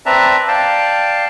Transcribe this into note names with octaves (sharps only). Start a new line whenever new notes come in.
C4 B4 D5 E5 A5 A#5
D5 F5 G5 A5